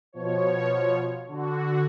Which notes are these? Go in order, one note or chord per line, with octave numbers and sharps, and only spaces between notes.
B2 F3 C#5
D3 F#4